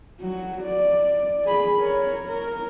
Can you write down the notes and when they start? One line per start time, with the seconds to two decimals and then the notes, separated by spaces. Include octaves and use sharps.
0.21 F#3 F#4
0.62 D5
1.45 G#4 B5
1.79 A#4 C#5
2.28 A#4